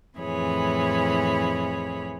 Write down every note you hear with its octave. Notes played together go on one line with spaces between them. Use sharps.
F2 A2 E3 G#4 C#5 B5